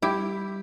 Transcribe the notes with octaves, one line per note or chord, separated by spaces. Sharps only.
G3 E4 G4